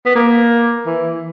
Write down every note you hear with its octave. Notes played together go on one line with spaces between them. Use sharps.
B3
A#3
E3